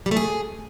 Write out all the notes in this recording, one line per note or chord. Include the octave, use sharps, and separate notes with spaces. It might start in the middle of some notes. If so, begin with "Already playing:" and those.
G3
A3
G#4